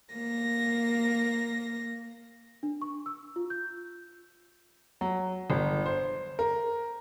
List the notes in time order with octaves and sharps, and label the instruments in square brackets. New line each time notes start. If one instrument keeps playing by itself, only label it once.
[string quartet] A#3 A#6
[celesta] D4
C#6
E6
F4
G6
[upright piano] F#3
G1
C5
A#4